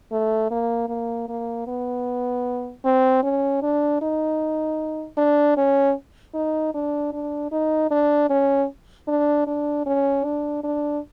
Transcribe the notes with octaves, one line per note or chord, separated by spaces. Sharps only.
A3
A#3
A#3
A#3
B3
C4
C#4
D4
D#4
D4
C#4
D#4
D4
D4
D#4
D4
C#4
D4
D4
C#4
D4
D4